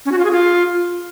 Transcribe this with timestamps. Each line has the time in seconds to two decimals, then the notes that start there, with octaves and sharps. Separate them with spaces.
0.05 C#4
0.12 F#4
0.18 F4
0.25 G#4
0.31 F4